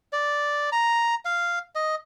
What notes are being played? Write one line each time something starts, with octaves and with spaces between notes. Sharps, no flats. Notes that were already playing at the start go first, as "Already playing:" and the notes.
D5
A#5
F5
D#5